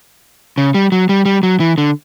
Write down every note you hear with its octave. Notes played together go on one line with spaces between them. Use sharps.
C#3
G3
F#3
G3
G3
F#3
E3
D3